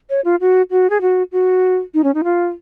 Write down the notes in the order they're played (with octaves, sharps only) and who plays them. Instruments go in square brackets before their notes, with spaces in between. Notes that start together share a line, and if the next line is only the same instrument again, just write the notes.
[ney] C#5
F4
F#4
F#4
G#4
F#4
F#4
D#4
C#4
D#4
F4